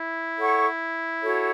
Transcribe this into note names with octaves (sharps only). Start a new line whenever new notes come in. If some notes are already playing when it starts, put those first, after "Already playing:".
Already playing: E4
A4 C#5 F#5 C#6
F#4 A4 C#5